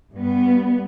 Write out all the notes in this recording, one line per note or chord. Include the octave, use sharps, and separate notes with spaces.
G2 B3